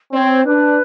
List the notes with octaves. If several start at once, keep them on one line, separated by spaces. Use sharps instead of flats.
C4 C#5 D5
D4 B4